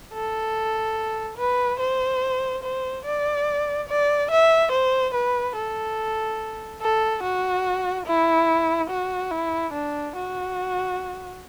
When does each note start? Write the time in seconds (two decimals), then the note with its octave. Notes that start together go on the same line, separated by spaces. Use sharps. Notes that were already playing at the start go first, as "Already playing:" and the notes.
0.13 A4
1.38 B4
1.80 C5
2.63 C5
3.05 D5
3.89 D5
4.31 E5
4.72 C5
5.14 B4
5.56 A4
6.81 A4
7.23 F#4
8.06 E4
8.90 F#4
9.31 E4
9.73 D4
10.15 F#4